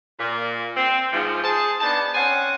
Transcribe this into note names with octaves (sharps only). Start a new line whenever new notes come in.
A#2
C4
G#2 F3
G#4 C5 A5
B3 D4 D#4 A5
C4 C#4 C5 F#5 G#5